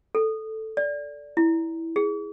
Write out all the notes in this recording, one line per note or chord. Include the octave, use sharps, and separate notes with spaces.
A4
D5
E4
G#4